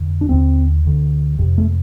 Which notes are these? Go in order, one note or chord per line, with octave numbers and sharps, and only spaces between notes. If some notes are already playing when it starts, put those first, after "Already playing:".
Already playing: F2 D3
D4
D#2 D3 C4
D2 D3
F2 C3
A3